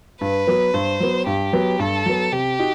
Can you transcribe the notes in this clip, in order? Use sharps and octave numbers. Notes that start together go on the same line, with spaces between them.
G2 B4
F#3 B3
G2 C5
F#3 B3
G2 G4
F#3 B3
G2 A4
F#3 B3
C3 G4
D#4 F#4